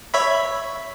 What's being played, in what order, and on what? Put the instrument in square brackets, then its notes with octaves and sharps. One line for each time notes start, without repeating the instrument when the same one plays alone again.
[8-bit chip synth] C#5 E5 B5